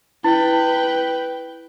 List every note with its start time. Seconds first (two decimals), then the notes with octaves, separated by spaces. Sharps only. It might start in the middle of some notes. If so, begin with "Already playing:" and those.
0.24 E4 B4 G5